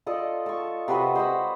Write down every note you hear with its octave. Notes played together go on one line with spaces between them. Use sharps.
F4 A4 D5 D#5
A5 C#6
C3 F#4 B4 D#5
C5 D#5 F#5 B5